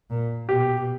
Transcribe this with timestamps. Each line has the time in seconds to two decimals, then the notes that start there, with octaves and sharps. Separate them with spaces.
0.10 A#2
0.49 B2 G4